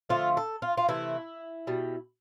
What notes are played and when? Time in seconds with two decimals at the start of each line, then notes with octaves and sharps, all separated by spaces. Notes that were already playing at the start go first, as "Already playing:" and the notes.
0.09 D3 F3 A3 F4
0.37 A4
0.62 F4
0.77 F4
0.88 C3 E3 A3 E4
1.67 B2 G3